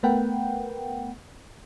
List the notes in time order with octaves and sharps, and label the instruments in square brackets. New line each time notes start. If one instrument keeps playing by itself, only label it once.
[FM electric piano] A3 B3 A#4 B4 F#5 G5